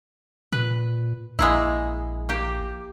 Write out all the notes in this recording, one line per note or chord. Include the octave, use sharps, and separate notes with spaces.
A#2 B4
A#1 G#3 A#3 E4
A#3 G4